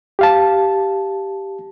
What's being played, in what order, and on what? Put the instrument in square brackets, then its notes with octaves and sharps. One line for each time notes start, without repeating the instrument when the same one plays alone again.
[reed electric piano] G4 F5 A5